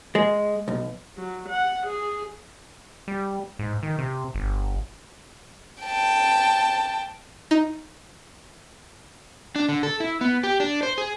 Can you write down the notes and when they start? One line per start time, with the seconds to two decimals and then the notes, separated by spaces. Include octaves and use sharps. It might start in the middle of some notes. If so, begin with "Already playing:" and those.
0.15 G#3
0.68 B1
1.17 F#3
1.49 F#5
1.86 G#4
3.08 G3
3.59 G#2
3.83 D#3
3.99 C3
4.34 G1
5.83 G5 A5
7.51 D#4
9.56 D4
9.69 D3
9.83 A4
10.00 E4
10.21 B3
10.43 G4
10.60 D4
10.83 C5
10.98 G#4